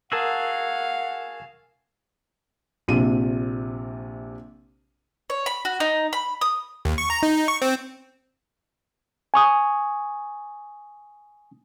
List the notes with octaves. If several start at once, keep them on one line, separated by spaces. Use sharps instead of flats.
F#4 G#4 A#4 F5 F#5 A5 E6
A#1 C3 F4 D#7
C#5
B5
F#4
D#4
B5
D#6
D#2
C#6
A#5
D#4
C#6
C4
G#5 C#6 D#6